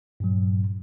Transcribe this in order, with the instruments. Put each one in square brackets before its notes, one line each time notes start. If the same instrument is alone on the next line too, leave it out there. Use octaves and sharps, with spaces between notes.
[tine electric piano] G2 A#2 F#3